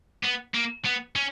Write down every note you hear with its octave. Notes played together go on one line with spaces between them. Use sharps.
B3
A#3
B3
C#4